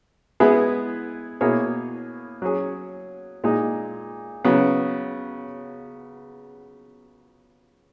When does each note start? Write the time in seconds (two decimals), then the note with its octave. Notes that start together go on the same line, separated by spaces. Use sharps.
0.40 G#3 B3 E4 G#4 B4
1.41 B2 A#3 E4 G#4 C#5
2.42 F#3 C#4 G#4
3.44 A#2 G#3 D#4
4.45 C#3 F#3 B3